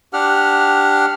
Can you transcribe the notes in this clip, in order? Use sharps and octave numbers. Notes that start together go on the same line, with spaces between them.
D4 G4 F#5 F6